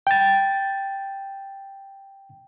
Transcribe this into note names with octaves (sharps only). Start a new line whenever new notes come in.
G5 A6